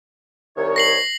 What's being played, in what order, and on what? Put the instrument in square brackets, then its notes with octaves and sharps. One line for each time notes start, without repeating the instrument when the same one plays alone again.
[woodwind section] C2 D#3 C#5
[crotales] A#6 C7 F#7